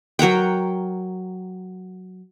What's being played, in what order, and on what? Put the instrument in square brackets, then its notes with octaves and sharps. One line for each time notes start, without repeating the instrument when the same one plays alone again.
[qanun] F#3 A#4 F#5 G5